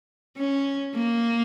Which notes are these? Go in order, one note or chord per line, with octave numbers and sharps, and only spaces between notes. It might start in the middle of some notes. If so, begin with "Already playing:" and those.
C#4
A#3